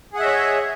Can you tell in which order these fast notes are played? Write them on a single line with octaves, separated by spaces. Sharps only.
G#4 F#5 E5 D#5 C#5